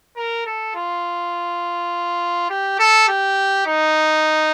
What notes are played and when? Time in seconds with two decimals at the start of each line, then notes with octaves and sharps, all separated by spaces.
0.16 A#4
0.46 A4
0.75 F4
2.50 G4
2.79 A4
3.08 G4
3.66 D#4